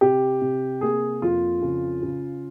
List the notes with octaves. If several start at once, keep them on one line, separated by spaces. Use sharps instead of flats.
C3 G4
C3
A#3 G#4
F2 F4
C#3
C#3